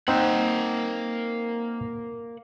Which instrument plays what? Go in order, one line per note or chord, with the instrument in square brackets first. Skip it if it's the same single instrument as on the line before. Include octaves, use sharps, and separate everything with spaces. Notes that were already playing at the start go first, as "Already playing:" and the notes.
[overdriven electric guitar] A#3 F#5 [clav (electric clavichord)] C4 D#4